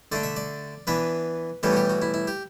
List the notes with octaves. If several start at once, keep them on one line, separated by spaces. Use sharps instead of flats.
D3 A3 D4 D5
E5
D5
E3 B3 D4 B4
A2 E3 G3 B3 A4
F#4
G4
F#4
E4
E4
G4